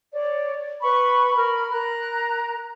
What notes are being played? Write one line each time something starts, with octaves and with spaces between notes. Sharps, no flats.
C#5 D5
B4 B5 C#6
A#4 B5 F6
A#4 A#5 F#6